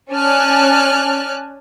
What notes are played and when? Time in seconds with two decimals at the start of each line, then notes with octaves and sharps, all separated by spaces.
0.11 C#4 D5 G#5 A5 F6 F#6